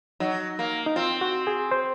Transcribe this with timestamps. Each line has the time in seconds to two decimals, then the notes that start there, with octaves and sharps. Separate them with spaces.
0.20 F#3 D#4
0.59 A#3
0.86 D#4
0.96 C4 F4
1.21 F#4
1.47 G#4
1.71 C5